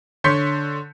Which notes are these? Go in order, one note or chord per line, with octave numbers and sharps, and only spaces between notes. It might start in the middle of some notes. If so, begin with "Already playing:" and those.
D3 C#5 C6 G6 B6 C#7